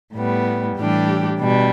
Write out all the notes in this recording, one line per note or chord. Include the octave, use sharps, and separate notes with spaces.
A2 G3 B3
A2 E3 G3 D4 G4
B2 G3 D4